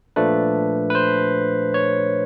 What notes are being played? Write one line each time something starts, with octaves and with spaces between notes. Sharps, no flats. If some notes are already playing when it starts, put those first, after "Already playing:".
A#2 F3 A3 D4 B4
B4
C5
C#5